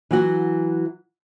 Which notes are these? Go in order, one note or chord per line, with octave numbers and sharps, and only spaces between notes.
E3 F#3 F#4